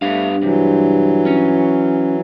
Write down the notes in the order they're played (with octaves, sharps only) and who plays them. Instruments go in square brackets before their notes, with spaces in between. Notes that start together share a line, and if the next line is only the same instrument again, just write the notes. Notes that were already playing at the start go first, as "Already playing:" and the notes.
[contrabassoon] G2 [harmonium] A3 [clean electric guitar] B3 D4 F5
[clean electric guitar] C3 [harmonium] E3 F#3
[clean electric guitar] C#4